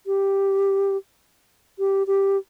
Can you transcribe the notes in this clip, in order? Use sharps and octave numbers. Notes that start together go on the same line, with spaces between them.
G4
G4
G4